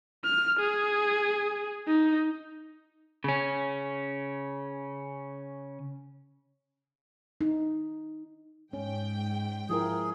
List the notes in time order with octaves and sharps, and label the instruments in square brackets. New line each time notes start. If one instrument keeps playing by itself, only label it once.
[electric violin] F6
G#4
D#4
[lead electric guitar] C#3 C#4
[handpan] D#4
[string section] G#2 G5 [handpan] C#4
[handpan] F3 E4 A#4 [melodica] G#4